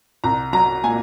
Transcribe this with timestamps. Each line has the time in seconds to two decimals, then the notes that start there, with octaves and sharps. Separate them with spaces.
0.24 C2 A#5
0.53 F#3 A#5
0.84 A#2 G#5